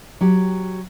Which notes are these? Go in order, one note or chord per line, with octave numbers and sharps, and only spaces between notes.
F#3 G4